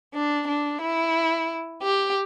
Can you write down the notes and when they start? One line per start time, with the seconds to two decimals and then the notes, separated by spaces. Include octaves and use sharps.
0.14 D4
0.48 D4
0.82 E4
1.83 G4